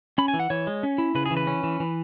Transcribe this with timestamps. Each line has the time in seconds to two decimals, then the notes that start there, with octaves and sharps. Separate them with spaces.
0.18 C#4 B5
0.28 G#5
0.34 E3
0.40 F#5
0.50 E3 C#5
0.67 G#3
0.83 C#4
0.98 E4
1.15 C#3 B4
1.26 G#4
1.31 E3
1.37 B4
1.47 C#4
1.64 E3
1.80 E3